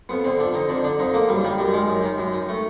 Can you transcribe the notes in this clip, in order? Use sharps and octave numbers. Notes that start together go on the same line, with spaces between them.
F2 B3
D3 C4
F2 D4
D3 D#4
F2 D4
D3 D4
F2 D#4
D3 A#3
F#2 G3
D#3 G3
F#2 G3
D#3 G#3
F#2
D#3
F#2
D#3
A3